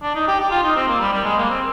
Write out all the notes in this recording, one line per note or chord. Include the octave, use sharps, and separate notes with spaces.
D4
D#4
G4
G4
F4
D#4
C4
A#3
G3
G3
G#3
A#3
C4